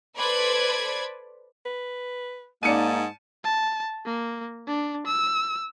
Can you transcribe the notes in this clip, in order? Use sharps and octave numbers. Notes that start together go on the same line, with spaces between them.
A4 B4 C5 D5 B5 G#6
B4
G#2 A#3 D#4 D5 A5 C#7 D#7
A5
A#3
D4
E6